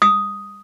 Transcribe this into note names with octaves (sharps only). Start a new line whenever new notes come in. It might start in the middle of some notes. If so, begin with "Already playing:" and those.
D#6